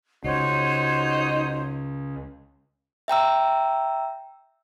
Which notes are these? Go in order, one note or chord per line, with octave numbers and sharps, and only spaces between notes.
C#2 D#4 F#4 C5 C#5
E5 G5 A#5 E6